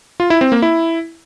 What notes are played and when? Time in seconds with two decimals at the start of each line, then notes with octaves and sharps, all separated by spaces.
0.20 F4
0.30 E4
0.41 C4
0.52 A#3
0.62 E4